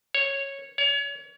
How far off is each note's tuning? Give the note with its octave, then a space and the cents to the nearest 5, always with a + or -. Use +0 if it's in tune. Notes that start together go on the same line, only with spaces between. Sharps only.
C#5 -10
C#5 +30